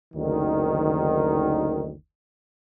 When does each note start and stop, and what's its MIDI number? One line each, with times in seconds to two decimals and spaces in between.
0.15 1.92 30
0.15 1.92 38
0.15 1.92 51